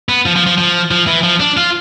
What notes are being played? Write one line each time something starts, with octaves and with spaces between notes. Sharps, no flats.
B3
F3
F3
F3
F3
F3
E3
F3
D4
F4